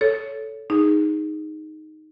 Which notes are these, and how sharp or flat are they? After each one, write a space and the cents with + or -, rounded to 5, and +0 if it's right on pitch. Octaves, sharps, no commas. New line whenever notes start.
A4 +0 C#5 +15
D#4 +0 G#4 -10